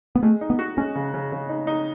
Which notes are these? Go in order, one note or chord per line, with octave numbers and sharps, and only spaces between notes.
B3
G#3 A3
D#4
B3
F#4
G#3 C#4
C#3
C#3
C#3
D#4
D#4